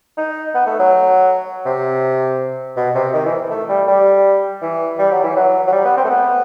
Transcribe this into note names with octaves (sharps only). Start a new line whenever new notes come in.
D#4
B3
A3
F#3
C3
B2
C3
D#3
E3
A3
G3
G3
E3
G3
F#3
E3
F#3
F#3
G3
B3
C4
A3
B3